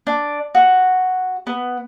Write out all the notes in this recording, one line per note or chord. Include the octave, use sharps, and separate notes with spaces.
D4
F#4
B3